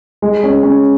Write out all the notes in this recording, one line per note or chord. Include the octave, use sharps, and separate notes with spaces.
G#3
C#4
C#4